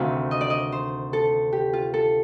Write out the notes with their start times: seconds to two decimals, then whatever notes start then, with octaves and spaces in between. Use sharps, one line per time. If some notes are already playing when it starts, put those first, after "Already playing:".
Already playing: D2 C3 D#3 F5
0.31 D#5
0.41 D5
0.50 D#5
0.72 C5
1.13 A4
1.53 G4
1.73 F4
1.94 A4